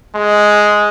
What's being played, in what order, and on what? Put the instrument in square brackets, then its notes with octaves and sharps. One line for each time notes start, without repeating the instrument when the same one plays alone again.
[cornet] G#3